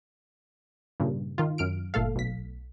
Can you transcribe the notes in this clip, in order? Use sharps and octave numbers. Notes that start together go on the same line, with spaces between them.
G2 A#2 C#3
D#3 F4
F#2 F6 D7
G1 A#2 A3 A4 F5
B1 B6